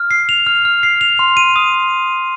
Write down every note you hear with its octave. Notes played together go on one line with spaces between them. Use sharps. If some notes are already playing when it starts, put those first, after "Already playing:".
Already playing: F6
C7
F7
F6
F6
C7
F7
C6
D#7
D#6